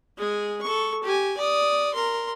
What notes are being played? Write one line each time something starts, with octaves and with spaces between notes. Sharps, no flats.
G#3 G#4
A4 C#6
G4 G#5
D5 D#6
A#4 C6